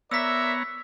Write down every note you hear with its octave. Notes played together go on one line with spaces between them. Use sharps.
B3 A#4 C#5 D5 E5 A#5 E6 B6